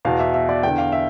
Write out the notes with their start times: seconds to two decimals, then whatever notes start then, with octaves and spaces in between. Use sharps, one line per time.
0.05 E2 B2 F5
0.19 E5
0.34 E5
0.49 D5
0.63 E2 D3 G5
0.78 F5
0.92 E5